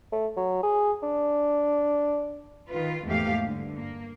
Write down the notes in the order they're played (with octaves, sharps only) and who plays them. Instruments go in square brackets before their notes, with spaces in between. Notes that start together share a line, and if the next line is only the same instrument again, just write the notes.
[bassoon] A3
F#3
G#4
D4
[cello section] D#3 F4 B4
E2 G#2 A3 A#3 G4 F5
G2 D3
A#3